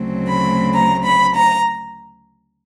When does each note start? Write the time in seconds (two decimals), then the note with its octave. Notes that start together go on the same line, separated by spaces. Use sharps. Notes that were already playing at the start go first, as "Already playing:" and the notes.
Already playing: D2 C#3 F#3 A3 C4
0.28 B5
0.74 A#5
1.05 B5
1.35 A#5